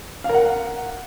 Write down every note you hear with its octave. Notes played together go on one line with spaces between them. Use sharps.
F5
A#4
F#5